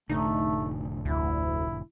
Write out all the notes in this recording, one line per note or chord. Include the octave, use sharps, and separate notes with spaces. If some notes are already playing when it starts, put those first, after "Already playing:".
F1 A2 D3 A3 D#4
D2 E4